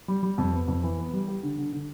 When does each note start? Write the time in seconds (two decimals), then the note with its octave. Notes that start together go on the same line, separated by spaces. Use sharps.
0.08 G3
0.23 G3
0.38 F2
0.53 B3
0.68 F2
0.83 E3
0.98 B3
1.13 G3
1.28 G4
1.43 D3
1.58 D3
1.73 D3